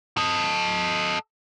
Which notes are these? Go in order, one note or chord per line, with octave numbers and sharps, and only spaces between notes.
A4 D#5